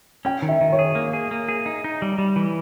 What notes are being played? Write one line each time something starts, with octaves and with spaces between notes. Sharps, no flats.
C#4 G5
D#3
E5
D#3
C#5
G#4
A#3
G#4
A#3
G#4
D#4
D#4
G3
G3
E3